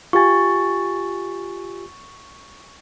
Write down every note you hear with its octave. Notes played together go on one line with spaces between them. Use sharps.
F4 G4 G#5 C#6 A6